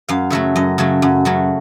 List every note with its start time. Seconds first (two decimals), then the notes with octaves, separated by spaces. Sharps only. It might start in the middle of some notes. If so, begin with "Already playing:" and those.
0.09 F#2 F5
0.30 C#3 F#3 A3 E5
0.56 F#2 D#5
0.78 C#3 F#3 A3
1.02 F#2
1.25 C#3 F#3 A3